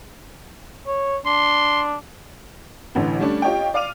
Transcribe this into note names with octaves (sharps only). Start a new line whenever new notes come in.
C#5
D4 C6
A1 D3 E3
G3 A3 C#4 D4
F4 G4 C#5 D#5 G5
D5 F5 D6 F6 D#7 F7